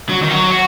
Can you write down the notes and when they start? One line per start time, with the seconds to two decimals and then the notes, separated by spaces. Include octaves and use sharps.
0.09 F#3
0.22 D#3
0.31 F#3
0.51 F#4